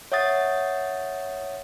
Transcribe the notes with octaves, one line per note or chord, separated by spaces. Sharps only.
C#5 E5 F#5 D#6 A6